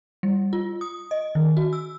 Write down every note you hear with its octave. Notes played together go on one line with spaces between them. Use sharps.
G3
F4
D#6
D#5
D#3
F#4
E6